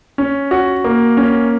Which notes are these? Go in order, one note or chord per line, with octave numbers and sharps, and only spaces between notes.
C#4
F#4
A#3
C#4